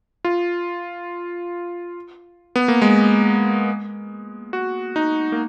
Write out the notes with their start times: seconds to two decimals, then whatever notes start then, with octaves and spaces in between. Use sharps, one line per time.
0.25 F4
2.56 B3
2.68 A#3
2.82 G#3
4.53 F#4
4.96 D#4
5.32 A#3